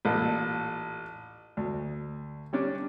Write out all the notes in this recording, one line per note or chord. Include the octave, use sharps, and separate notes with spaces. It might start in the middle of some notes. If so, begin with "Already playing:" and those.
A1 A#2 A4
D2
G3 C#4 D4